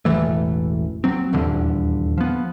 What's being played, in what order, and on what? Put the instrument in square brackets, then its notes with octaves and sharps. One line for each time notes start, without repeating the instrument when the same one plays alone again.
[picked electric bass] E1 A1 E3 A3
F#3 C4
D#1 E2 G2 D3
F3 B3